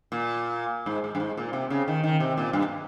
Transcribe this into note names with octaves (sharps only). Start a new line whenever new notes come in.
A#2
G#2
G#2
G2
G#2
A#2
C3
C#3
D#3
D#3
C3
A#2
G2